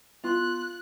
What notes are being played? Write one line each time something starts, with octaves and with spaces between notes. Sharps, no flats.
B3 F4 C6 F#6